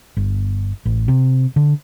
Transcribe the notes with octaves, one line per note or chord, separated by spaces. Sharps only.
G1
A1
C3
D3